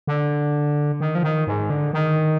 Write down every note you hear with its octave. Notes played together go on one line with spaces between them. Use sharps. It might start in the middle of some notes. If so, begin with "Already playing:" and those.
D3
D#3
F3
D#3
G#2
D3
D#3